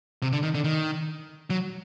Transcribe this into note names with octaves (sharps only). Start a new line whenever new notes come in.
C3
D3
D#3
D3
D#3
F#3